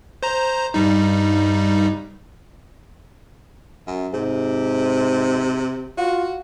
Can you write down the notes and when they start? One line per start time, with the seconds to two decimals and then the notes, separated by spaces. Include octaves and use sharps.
0.23 C5 A#5
0.74 G2 G3 D#4
3.87 F#2
4.14 G#2 C3
5.98 F4 F#4